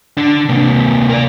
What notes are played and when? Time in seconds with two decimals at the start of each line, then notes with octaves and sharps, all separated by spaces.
0.17 D3 D4
0.49 C3 A#3
1.09 A#4 D5